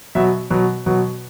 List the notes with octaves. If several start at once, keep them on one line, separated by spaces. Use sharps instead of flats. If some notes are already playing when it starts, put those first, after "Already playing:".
B2 F#3 E5
B2 F#3
B2 F#3